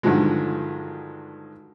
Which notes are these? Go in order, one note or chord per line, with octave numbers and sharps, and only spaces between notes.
G2 D3 D#3 F3 F#3 G#3